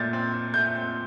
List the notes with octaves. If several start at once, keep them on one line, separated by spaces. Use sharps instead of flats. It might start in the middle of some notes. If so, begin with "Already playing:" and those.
Already playing: A#2 A3 G6 A6
C4
C4
A3 G6
C4